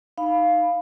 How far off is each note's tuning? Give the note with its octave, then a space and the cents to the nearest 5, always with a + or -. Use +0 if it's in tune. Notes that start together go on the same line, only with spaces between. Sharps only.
D#4 +5 F5 +0 B5 +0